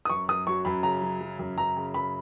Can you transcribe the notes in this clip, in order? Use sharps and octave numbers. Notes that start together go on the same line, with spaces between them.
D#6
F#2 C#6
F#2 D#6
F#3 C#6
F#2 B5
C#3 A#5
F#3
F#3
F#2
F#2 A#5
C#3
F#2 B5